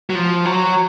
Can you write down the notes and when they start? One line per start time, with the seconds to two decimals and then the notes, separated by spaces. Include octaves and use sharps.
0.10 F#3
0.15 F3
0.45 F#3